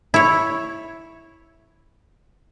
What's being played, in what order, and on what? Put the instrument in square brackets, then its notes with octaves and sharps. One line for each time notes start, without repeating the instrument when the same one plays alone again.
[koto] E4 C#5